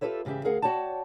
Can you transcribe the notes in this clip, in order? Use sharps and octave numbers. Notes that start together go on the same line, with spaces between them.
F4 G4 A4 B4 C#5 E5
G#2 C#3 E3 G4 E5
D2 G#4 A#4 F5 F#5
F#4 C#5 D5 G5 A5